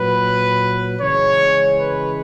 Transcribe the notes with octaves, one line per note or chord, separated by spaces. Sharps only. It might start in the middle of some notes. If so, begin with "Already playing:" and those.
Already playing: A#2 F#3 B4
C#3 E3 G#3 C#5
B4